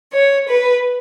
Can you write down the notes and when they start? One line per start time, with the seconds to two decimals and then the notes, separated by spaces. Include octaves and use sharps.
0.13 C#5
0.49 B4